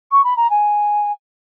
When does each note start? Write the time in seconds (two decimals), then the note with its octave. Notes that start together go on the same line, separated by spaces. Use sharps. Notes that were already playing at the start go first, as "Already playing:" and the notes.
0.12 C#6
0.24 B5
0.37 A#5
0.50 G#5